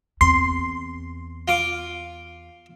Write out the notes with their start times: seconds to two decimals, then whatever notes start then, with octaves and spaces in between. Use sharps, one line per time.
0.21 E2 C4 C6 C7
1.48 F4 D6